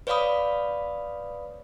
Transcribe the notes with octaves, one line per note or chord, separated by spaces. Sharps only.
B4 C#5 D5 F5 B5 D#6